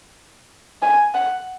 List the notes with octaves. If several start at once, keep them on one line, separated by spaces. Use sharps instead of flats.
G#5
F#5